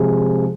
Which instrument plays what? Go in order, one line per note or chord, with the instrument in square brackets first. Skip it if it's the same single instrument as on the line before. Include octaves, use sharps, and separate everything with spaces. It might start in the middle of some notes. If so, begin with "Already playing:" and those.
Already playing: [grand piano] C3 F3 G#3